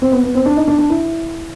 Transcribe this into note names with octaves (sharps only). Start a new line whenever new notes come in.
C4
B3
B3
C4
D4
D#4
D4
D4
E4